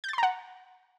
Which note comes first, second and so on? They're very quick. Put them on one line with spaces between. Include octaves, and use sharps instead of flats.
G6 A6 C6 A#5 F#5